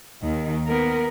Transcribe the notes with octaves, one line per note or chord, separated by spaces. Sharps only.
D#2 D#3
B3 A#4